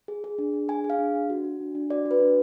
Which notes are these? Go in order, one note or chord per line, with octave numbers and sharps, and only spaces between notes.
G#4
G#4
D4
D4
G#4 G#5
G#4
F5
D4
D4
F#4
F#4
D4
D4
F#4 D5
F#4
B4
D4